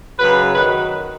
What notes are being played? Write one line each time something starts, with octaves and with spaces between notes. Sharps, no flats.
F#2 C#3 F#3 B4
F#2 D#3 F#3 B4